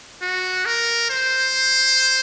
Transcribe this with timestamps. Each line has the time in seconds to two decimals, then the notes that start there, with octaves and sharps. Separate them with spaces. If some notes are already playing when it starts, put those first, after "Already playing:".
0.22 F#4
0.66 A#4
1.10 C5